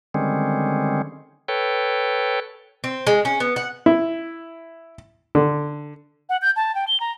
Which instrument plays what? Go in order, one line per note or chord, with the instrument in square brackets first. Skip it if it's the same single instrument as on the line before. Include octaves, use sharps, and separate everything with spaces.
[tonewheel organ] D3 D#3 G3 G#3 C4 C#4
A4 B4 C#5 G5
[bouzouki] C4
G#3
C#4
B3
F#5
[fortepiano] E4
D3
[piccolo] F#5
G6
A5
G5
G7
A#5